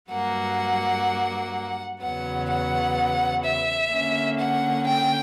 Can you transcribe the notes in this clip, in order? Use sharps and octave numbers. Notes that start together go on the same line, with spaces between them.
G2 F#3 A#3 F#5
E2 C#3 F#3 B3 F#5
F#5
E5
D3 A#3 C#4
F#5
G5